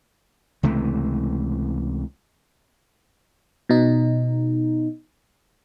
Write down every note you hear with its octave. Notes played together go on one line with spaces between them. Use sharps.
C#2 C3 E3 A3
B2 D#4